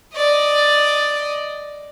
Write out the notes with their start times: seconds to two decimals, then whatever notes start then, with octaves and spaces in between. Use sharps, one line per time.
0.14 D5 D#5